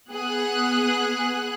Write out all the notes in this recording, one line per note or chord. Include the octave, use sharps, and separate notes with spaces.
B3 G#4 F#6